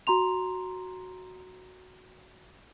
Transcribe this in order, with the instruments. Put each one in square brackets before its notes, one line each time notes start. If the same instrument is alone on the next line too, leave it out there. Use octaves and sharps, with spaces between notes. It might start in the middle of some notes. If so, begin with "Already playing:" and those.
[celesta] F#4 A#5 C6 F7